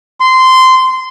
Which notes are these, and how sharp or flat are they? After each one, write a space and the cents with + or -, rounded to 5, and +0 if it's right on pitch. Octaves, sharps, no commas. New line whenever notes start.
C6 -15